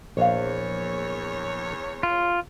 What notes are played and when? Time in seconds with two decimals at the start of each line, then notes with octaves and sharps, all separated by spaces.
0.17 A#1 E2 C#5 F5
2.03 F4